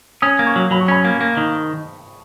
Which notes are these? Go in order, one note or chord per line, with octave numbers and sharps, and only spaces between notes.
C#4 D#6
A#3
C#6
F#3
F#3 B5
C#6
C#4 B5
A#3
A#3
D#3